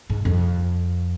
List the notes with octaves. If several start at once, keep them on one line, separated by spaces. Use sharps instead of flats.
G#2
F2